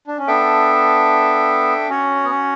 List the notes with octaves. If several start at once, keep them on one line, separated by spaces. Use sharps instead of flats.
D4
C#4
B3 D4 A4 E5 G5
C#4 F#4 C#5 F#5
B3
C#4